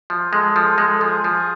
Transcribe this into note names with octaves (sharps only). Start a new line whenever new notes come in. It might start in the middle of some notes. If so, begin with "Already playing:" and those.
F3
G#3 A4
F3
A4
G#3
F3 G#4
F3